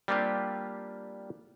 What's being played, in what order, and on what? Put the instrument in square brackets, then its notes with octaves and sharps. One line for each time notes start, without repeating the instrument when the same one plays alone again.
[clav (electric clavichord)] G3 A#3 C4 D4 F4 G4